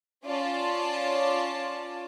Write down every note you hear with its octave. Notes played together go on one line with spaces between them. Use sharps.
C#4 F4 D5 A5